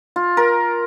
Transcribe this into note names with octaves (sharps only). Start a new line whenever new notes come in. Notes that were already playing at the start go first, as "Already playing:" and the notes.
F4
A#4